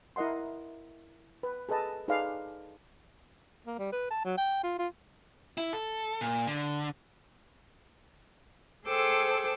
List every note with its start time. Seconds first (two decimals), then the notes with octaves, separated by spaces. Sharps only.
0.16 E4 A#4 D#5 F#5 C6
1.43 B4
1.69 G#4 A4 B4 D#5 A5
2.08 D#4 G#4 A4 B4 D5 F5
3.67 A#3
3.79 G3
3.92 B4
4.10 A5
4.25 F#3
4.37 G5
4.63 F4
4.79 F4
5.58 E4
5.73 A4
6.21 A#2
6.47 D3
8.87 G#4 A4 C5 G5 D6 E6